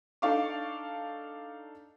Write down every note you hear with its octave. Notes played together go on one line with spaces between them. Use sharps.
D4 D#4 A4 F5 C#6 D6